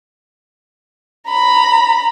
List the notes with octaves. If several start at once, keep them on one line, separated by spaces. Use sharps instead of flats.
A#5 B5